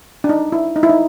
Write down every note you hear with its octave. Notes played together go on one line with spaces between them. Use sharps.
D4
D#4
E4
D#4
E4
D#4